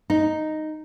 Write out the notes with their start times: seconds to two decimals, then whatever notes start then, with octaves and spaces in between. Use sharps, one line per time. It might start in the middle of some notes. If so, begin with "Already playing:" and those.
0.10 D#4